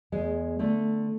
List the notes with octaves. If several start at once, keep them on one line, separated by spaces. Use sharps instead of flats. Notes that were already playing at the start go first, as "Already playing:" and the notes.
E2 G#3
D3 A3